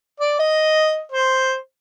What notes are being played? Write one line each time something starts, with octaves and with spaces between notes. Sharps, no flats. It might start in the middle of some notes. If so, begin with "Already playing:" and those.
D5
D#5
C5